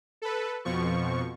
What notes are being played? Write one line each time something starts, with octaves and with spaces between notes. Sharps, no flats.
A4 B4
F2 B2 F3 C#6